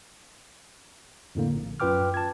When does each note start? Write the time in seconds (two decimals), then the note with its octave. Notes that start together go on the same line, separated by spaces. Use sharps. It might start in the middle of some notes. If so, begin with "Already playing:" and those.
1.35 F2 A2 D3 A#3
1.53 A#1
1.80 F#2 F4 B4 G5 D6 F6
2.14 A5 G#6